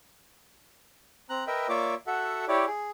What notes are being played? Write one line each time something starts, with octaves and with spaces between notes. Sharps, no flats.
C4 A#5 F#6
A#4 B4 D#5 E5 G5
A#3 F4 C#5 D5 E5 D6
F#4 A4 E5 F#5
E4 G4 C#5 D5
G#4